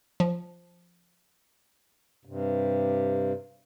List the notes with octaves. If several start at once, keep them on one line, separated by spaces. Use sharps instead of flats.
F3
G2 C3